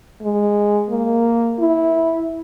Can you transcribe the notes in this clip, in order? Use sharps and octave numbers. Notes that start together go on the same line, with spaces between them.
G#3
A#3
E4